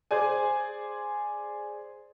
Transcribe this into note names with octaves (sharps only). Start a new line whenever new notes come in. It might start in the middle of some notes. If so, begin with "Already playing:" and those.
G#4 C5 D5 G#5